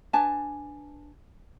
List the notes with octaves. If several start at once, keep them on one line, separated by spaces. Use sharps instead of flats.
D4 B4 G#5 A5